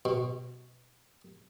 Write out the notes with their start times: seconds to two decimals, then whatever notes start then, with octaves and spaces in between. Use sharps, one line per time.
0.05 B2